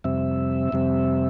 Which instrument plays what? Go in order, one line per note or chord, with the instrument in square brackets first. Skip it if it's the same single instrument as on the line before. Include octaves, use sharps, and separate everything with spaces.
[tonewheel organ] F2 C3 G3 C4 E5
F2 C3 G3 C4